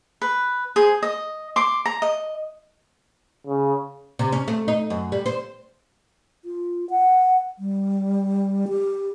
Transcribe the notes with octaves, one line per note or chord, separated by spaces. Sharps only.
B4
G#4 C5
D#5
C6 D6
A#5
D#5
C#3
C3
C#4
A3
D#4
F#2
G3
C5
F4
F#5
G3
G4